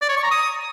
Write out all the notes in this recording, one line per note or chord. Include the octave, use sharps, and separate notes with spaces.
D5
C#5
C#6
A#5
D#6